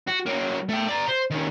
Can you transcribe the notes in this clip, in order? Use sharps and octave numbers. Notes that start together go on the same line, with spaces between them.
F#4
F#3 A#3
A3 G5
D5 A#5
C5
D#3 C#4